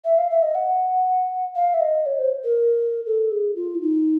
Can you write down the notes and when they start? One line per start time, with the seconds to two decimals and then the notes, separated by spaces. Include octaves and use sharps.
0.05 E5
0.18 F5
0.31 E5
0.42 D#5
0.55 F#5
1.56 F5
1.74 E5
1.80 D#5
2.06 C#5
2.19 C5
2.44 A#4
3.06 A4
3.31 G#4
3.56 F4
3.75 E4
3.82 D#4